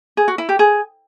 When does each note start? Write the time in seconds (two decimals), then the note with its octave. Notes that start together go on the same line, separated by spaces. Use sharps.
0.17 G#4
0.28 F#4
0.38 E4
0.49 G4
0.59 G#4